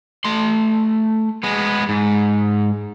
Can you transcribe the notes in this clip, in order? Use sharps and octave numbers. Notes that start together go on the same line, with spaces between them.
A3 C6
G#3 B3
G#2